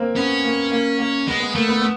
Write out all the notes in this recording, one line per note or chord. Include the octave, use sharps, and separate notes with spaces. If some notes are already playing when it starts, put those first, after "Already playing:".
Already playing: A#3 C4
B3 C#4
A#3
A#3
A#3
G#3 B3
B3
A3 A#3
B3
B3